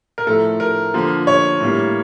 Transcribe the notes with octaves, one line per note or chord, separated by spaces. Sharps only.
A#4
A2 F3 A3 A4
A#4
D3 F3 A#3
C#5
A2 G3 A#3